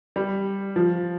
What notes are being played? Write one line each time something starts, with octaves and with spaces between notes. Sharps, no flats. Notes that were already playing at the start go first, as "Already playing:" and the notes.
G3
F3